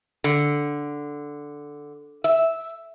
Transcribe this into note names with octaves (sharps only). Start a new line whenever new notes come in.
D3
E5